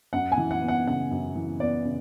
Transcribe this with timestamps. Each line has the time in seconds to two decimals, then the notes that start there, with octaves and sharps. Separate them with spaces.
0.13 F#2 F#5
0.32 G#5
0.38 E3
0.51 F#5
0.62 B3
0.68 F#5
0.87 C#3 F#5
1.11 F#2
1.36 E3
1.60 B3 D5
1.85 C#3